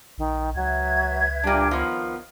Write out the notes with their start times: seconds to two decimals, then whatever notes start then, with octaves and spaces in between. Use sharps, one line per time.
0.18 A#1 D#3
0.55 C#2 F#3 B4 E5 G#6
1.43 A#2 G3 D4
1.71 D#3 F3 B3